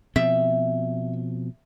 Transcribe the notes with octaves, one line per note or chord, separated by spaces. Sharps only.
B2 F3 C4 E5